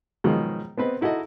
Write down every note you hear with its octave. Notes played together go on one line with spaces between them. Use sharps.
G#2 B2 D#3 F3 F#3
B3 C4 B4 D#5
D#4 E4 F#4 A4 D#5